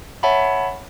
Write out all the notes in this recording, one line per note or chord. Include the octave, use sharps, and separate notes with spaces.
C#5 E5 F#5 A5 B5